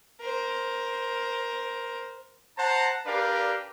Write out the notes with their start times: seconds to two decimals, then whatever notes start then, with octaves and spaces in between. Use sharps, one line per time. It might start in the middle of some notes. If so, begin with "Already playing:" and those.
0.20 A#4 C5
2.57 C5 F#5 A5 A#5
3.06 D4 G4 A#4 B4 D5 F5